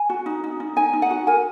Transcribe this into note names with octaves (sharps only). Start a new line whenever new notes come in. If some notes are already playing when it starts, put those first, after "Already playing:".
Already playing: G#5
F#4
D#4
D#4
D#4
D#4 G#5
D#4
F#5
F#4
A#4 G#5